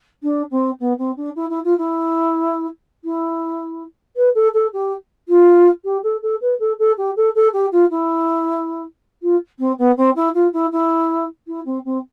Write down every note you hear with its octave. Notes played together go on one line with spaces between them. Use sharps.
D4
C4
B3
C4
D4
E4
E4
F4
E4
E4
B4
A4
A4
G4
F4
G4
A4
A4
B4
A4
A4
G4
A4
A4
G4
F4
E4
F4
C4
B3
C4
E4
F4
E4
E4
E4
C4
C4